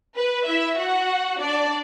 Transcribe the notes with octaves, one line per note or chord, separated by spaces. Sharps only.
B4
E4 E5
F#4 F#5
D4 D5